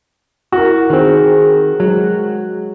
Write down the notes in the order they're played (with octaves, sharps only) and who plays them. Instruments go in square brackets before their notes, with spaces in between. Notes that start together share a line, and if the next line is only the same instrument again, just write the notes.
[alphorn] E4 [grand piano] F#4 A#4
[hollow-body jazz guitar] D#3 C4 [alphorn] G#4
[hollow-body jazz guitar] F#3 [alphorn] G#3